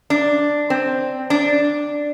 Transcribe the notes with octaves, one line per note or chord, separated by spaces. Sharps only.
D4
C4
D4